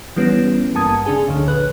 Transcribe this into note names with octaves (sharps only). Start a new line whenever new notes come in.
E3 G3 B3 C#4
G#1 G2 A#3 A5 D#6 G#6
C#3 D4 G#4 G#5
D2 D3
A#1 B4 F#6